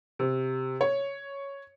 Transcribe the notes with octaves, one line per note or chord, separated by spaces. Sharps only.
C3
C#5